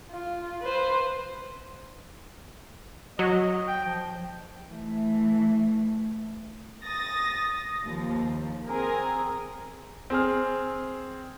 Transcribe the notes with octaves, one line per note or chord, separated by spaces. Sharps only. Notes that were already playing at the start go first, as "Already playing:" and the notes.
F4
B4 C5
F#3 D#5
G5
F3
E3 A3
D#6 A6 A#6
D#2 F3
C4 G#4 A#4
C4 G#4 F6